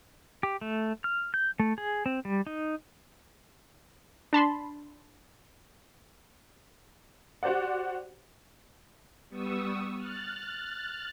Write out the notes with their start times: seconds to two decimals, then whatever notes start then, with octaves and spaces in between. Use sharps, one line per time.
0.43 G4
0.61 A3
1.04 F6
1.34 G6
1.59 A3
1.78 G#4
2.06 C4
2.25 G3
2.47 D#4
4.33 D4 A5 B5 C6
7.43 F#4 G4 C5 D5 F#5
9.29 G3 B3 C#6 D#6 E6
9.95 F6 F#6 A6